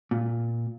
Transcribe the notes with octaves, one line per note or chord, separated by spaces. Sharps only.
A#2